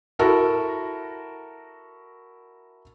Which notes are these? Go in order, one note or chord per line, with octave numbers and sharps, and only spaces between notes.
E4 F#4 A4 A#4